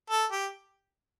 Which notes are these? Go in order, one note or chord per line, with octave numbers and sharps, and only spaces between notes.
A4
G4